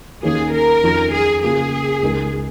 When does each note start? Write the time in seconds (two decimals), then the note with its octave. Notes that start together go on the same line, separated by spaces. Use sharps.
0.23 D#2 D#3 A#3 C#4 G#4
0.52 A#4
0.83 F2 D#3 C#4 F4
1.12 G#4
1.42 C#3 A#3 F4 G#4
2.02 C#2 C#3 G#3 D#4 A#4